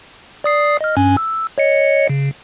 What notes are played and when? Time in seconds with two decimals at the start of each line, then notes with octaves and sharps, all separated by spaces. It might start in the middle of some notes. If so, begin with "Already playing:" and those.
0.44 D5 D#6 C7
0.81 D#5 F6
0.96 G2 C#4 G#5
1.17 E6
1.58 C#5 D#5 C#7
2.09 C#3